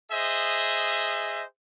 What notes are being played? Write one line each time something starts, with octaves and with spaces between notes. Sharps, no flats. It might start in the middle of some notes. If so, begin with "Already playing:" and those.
G#4 C5 D#5 E5